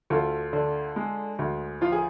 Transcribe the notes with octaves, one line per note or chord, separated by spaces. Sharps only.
D2 F4 A4
D3
G#3
D2
F3 F4
G#4